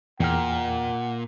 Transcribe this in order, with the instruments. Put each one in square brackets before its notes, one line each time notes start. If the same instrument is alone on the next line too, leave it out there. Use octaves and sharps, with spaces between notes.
[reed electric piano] E2 G5 F6 [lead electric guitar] A#2 [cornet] F#5